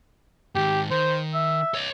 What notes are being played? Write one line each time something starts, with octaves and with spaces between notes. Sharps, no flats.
G#2 D#3 G4
D#3 C5
E5
C#5 D#5